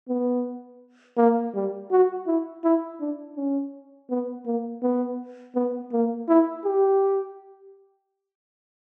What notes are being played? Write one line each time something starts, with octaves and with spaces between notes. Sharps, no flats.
B3
A#3
G3
F#4
E4
E4
D4
C#4
B3
A#3
B3
B3
A#3
E4
G4